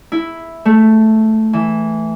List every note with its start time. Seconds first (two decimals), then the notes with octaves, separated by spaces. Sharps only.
0.12 E4
0.65 A3
1.53 E3